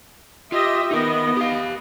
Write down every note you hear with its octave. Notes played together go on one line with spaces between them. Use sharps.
F4 G4 D#5 E5
B3 D#4 A#4 D#5
G4 F5